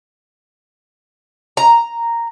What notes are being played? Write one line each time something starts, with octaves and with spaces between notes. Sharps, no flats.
A#5